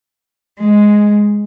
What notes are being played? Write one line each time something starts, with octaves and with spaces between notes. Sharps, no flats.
G#3